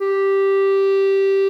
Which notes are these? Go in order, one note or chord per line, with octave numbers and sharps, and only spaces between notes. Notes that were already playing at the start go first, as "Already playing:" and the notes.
G4